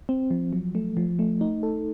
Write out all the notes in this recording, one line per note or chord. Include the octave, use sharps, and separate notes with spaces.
C4
F3
F#3
A3
F3
A3
D#4
A4